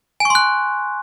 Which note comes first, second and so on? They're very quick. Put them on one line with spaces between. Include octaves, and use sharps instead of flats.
G#5 C#6 C6 F#6